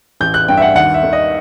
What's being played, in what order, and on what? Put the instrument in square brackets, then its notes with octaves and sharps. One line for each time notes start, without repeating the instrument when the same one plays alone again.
[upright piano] A1 G6
F#6
G2 G5
E5
F#5
D#2 F#5
E5
D#3
D#5